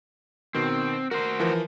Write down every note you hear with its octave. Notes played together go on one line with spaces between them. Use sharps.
B2 D#3 C4
F#4 A#4 C5
E3 F3 A#4